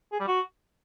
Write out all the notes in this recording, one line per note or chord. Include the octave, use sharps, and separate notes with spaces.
G#4
G3
F#4